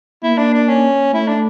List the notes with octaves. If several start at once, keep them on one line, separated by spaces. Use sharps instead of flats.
A#3 E4
D4
D4
C#4
A3 E4
D4